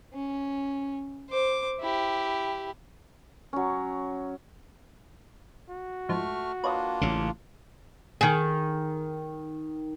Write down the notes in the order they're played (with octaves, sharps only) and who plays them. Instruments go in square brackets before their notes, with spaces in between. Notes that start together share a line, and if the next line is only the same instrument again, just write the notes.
[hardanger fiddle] C#4
C5 D6
E4 G4
[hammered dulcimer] F#3 C#4
[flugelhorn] F#4
[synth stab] G#2 F3 [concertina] A3 C#6 F6
[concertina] A#3 D4 F4 [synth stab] B4 C#5 D#5
[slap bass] A1 C#3
[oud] D#3 G#4